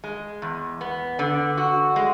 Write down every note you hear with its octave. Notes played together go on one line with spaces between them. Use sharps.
G#3
E2
B3
D3
F#4
G#3